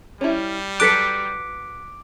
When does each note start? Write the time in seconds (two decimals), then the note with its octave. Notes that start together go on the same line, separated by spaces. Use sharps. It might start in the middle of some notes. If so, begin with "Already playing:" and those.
0.21 G3 C#4 E4
0.80 F#3 A4 B4 D6 F#6 B6 C#7